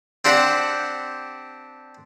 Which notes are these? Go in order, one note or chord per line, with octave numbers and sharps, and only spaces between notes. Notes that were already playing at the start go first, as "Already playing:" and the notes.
C4 D4 G4 F#5